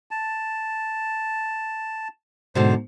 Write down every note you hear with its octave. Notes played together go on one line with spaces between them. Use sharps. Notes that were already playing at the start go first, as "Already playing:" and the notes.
A5
G#2 B2 D3 C5